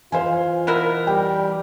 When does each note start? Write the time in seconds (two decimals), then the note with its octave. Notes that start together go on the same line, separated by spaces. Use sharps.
0.12 E3 F4 C5 F5 G#5
0.67 B2 E4 A#4
1.07 G3 G5